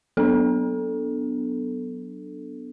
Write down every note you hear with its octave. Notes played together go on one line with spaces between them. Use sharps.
F#3 B3 D4 A4